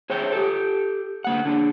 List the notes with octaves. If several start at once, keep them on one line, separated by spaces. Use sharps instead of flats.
G#4 C5 C#5 E5 G5
G4 A4
D3 A#3 F#5
D3 D4 G#4